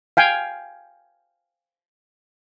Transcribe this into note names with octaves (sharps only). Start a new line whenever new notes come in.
F5 G5 G#5